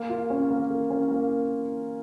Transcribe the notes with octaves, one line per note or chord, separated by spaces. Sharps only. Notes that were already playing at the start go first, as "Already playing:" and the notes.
Already playing: A#3
F4
C#4
A#3
A#4
C#4
A#3